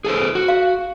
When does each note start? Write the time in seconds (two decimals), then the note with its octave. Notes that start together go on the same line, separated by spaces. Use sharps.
0.05 G#4 A4 C5
0.35 F#4
0.48 F5